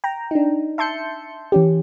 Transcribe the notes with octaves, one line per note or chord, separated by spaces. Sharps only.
G5 A#5
D4 D#4
E5 A5 C6 G6 C#7
E3 C#4 G4